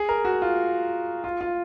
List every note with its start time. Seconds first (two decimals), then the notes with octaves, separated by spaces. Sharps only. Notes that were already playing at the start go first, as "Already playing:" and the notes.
Already playing: G#4
0.09 A#4
0.25 F#4
0.42 F4
1.24 F4
1.41 F4